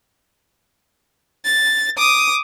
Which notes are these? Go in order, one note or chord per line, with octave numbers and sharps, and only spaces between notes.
A6
D6 D#6